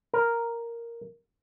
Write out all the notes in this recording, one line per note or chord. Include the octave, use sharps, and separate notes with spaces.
A#4